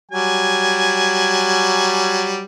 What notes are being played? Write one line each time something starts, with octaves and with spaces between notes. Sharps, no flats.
F#3 G3 G#5